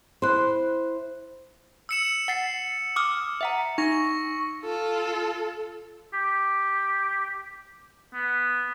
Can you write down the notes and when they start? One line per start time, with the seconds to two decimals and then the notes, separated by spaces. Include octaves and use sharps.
0.22 E4 C5 C6 F#6
1.89 E6 C#7 E7
2.28 F#5 A6 C7
2.96 D6 D#6 F6
3.41 E5 F#5 A#5
3.78 D#4 C#6 A#6
4.64 F4 A4
6.14 G4
8.14 B3